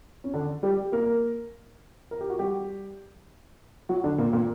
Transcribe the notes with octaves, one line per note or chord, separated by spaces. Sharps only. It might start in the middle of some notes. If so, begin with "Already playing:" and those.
C#4
D3 D4
G3 G4
A#3 A#4
A#4
G4
F#4
G3 G4
F#3 F#4
D3 D4
A#2 A#3
A#2 A#3